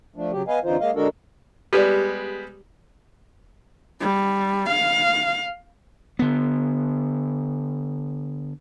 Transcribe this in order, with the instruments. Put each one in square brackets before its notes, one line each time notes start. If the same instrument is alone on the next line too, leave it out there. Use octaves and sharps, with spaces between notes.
[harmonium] F3 A3 D4
C#3 F#3 G4
B3 B4 D#5 F5 G#5
F2 D3 E3 D#4 F4 C5
G#3 A#3 D#5 F5
D3 G#3 D4 F#4 A4 A#4
[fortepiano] G3 G#3 B3 [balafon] G4 D5
[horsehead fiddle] G3
F5
[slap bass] D3 B3